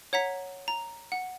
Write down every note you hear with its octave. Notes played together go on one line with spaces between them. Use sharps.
C#5 F#5 A#5 B6
A#5
F#5